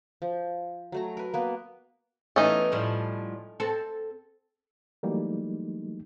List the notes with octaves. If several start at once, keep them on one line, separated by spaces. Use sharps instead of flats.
F3
F#3 A3 A#5
A#4 B4
A#3 B3 B4
E3 A3 B3 C#4 D#4
A2 F3 G3
C4 A4
E3 F#3 G3 A3 A#3 D#4